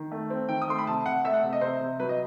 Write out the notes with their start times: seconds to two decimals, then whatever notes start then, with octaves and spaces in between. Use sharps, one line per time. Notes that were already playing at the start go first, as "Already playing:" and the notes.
Already playing: D#3
0.12 A3
0.30 C4
0.49 D#3 G5
0.62 D#6
0.68 A3 C6
0.78 B5
0.87 C3 A5
1.05 C3 F#5
1.24 A3 E5
1.34 F#5
1.44 C3
1.53 D#5
1.61 C3 C5
1.81 C3
2.00 F#3 B4
2.09 D#5